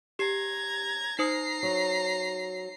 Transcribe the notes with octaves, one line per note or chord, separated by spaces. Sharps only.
G4 A#5 G#6 C7
D#4 C5 A#5 D#6 C7
F#3